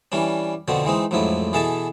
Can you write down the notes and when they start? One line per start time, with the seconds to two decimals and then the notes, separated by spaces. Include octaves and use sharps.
0.12 E3 G3 C#4 D4
0.68 B2 D3 F3 C4 F#4
0.85 E3 G#3 C4 D#4
1.11 A1 F2 G#2 F3 F#3 E4
1.53 B2 E3 G#4 A4 E5 A5